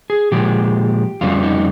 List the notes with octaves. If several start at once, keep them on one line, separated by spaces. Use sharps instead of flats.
G#4
A#2 F3 G#3 G4
F2 C#3 G3 F4
D#4